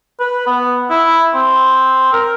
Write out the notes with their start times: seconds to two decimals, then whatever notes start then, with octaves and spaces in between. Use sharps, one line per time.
0.19 B4
0.46 B3
0.90 E4
1.34 C4
2.13 A#4